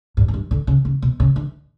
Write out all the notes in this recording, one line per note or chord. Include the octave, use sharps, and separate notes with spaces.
G2
F#2
G2
D3
C#3
C#3
B2
C#3
D3